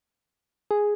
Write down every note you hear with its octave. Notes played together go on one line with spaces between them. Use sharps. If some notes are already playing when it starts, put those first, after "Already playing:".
G#4